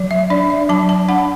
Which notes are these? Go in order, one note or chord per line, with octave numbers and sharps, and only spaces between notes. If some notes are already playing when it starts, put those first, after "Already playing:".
Already playing: F#3
E5
D4 D5
E5
F#3 A5
A5
D4 F#5